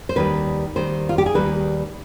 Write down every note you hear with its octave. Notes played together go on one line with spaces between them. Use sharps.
C5
D#2 D#3 G3 B4
D#2 D#3 G3 C5
F4
G4
G#4
D#2 D#3 G3 B4